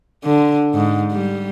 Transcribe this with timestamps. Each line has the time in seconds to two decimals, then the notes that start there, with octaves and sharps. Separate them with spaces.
0.24 D3
0.75 G#2
1.12 G3